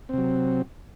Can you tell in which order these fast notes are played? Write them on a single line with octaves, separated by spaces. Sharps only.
C4 C3 F#3